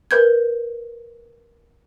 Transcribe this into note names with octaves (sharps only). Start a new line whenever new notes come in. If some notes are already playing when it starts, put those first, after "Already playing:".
A#4 B4 G6 G#6